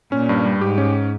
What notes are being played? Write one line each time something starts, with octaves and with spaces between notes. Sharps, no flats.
A#2 C#4
G2
G3
G#2 G4
C#4